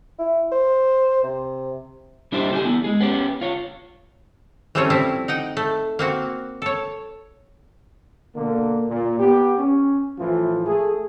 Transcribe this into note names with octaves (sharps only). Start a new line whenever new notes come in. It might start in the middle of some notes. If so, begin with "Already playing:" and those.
E4
C5
C3
G3 D4 E4 G4 C5
D3 G4 D5 G#5
B3 E4
G#3 G#4
B3 C#4 G4
F4 C#5
E3 G3 A3 C4 C#4 C#5
F3 G3 C4 E4
D#4 F#5 G5
A3
A#3 C4 F#4
A4 C#5
B2 D3 A#3
A#2
B3 G4
C#4
A2 E3 F3 F4
A3 G#4